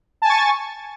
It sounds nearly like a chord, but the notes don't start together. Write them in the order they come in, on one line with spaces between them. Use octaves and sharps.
A5 G#5 A6 C#6